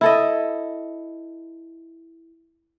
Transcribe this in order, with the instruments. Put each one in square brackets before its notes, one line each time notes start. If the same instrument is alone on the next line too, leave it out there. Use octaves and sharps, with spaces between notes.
[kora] E4 A4 D#5